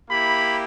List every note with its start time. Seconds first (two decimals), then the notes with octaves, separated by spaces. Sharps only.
0.10 A#3 E4 G4 B5